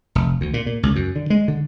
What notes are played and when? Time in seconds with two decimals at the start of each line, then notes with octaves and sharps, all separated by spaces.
0.15 F1
0.41 D2
0.54 A#2
0.66 A#2
0.83 C#2
0.96 F#2
1.16 D3
1.30 G#3
1.48 D3